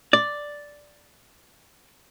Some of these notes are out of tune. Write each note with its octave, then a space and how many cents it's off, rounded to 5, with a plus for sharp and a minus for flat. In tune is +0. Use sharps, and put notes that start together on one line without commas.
D5 +0